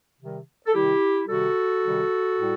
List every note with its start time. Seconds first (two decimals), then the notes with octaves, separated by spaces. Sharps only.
0.20 C3 D#3 G3
0.66 A4
0.74 C3 D#3 G3 E4 G4
1.28 C3 D#3 G3 F#4 A4
1.83 C3 D#3 G3
2.37 A2 G3